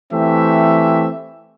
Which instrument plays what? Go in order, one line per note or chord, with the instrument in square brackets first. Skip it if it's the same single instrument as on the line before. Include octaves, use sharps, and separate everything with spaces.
[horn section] E3 A3 C4 G4 E5